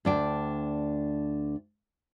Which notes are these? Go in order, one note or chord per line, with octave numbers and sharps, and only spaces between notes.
D2 D4 G5